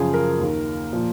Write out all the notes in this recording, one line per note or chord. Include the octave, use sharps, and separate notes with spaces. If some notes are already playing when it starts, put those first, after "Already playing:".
Already playing: F#2 C#3 F3 G#4
A#4
D#2 D#3
A#2 F3